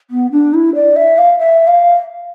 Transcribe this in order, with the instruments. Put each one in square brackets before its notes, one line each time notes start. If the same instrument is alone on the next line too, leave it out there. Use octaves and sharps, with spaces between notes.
[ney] B3
D4
E4
D5
E5
F5
E5
F5